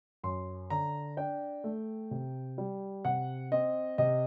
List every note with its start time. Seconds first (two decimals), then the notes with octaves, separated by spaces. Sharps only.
0.23 F#2 C6
0.70 D3 A#5
1.17 D4 G5
1.64 A3
2.11 C3
2.58 G3
3.05 C3 F#5
3.52 C4 D#5
3.98 C3 D#5